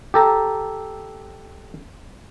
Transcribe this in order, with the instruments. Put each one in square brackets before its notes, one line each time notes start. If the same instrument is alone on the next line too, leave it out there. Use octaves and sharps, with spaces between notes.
[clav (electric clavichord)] G4 A4 A#5